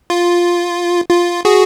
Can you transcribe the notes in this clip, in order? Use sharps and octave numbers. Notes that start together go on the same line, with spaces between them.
F4
F4
F#4 G#4